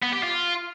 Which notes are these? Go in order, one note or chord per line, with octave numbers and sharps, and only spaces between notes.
B3
G4
F4